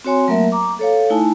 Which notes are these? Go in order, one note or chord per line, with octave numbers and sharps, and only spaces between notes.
C4 F#4 C#5 G#5 C6
F#3 A3 A#3 A#4 E5
A#5 D6
A4 C#5 F5
A3 D#4 E4 G#5 A5